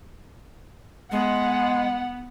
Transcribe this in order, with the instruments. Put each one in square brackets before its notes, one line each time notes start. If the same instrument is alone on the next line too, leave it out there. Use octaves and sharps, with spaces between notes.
[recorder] G#3 [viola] B3 [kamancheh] F#5